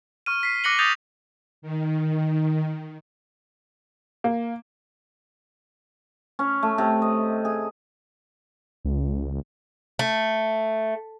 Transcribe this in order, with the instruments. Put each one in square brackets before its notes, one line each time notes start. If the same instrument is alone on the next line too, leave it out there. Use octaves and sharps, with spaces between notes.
[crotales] C#6 F6 D#7
B6 C7
D6 F#6 A#6 C#7 F#7 G7
D#6 G6 A6 A#6 F7
[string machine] D#3
[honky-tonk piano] A#3
[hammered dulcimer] C#4
A3
C3
D#5
G#4
[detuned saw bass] C#2
[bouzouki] A3